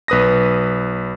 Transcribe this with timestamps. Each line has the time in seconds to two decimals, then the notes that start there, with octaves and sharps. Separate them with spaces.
0.08 B1 B4 D#6 A#6